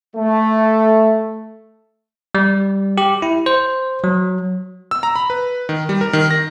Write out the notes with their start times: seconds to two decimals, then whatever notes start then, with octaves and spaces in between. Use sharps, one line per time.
0.16 A3
2.35 G3
2.98 G4
3.22 E4
3.46 C5
4.04 F#3
4.91 E6
5.03 A#5
5.16 B5
5.30 B4
5.69 D#3
5.89 G3
6.01 A#4
6.13 D#3
6.31 A#6